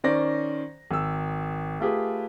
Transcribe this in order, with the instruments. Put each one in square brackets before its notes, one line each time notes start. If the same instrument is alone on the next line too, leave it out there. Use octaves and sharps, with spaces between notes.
[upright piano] D#3 C#4 C5 D5 A#6
G#1 E6
A3 F4 G4 G#4 B4